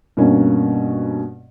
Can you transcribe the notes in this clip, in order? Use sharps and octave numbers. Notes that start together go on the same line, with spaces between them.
G2 B2 A#3 C#4